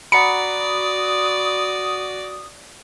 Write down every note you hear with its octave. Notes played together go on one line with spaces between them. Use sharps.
F#4 D5 F#5 A#5 B5 D#6 C#7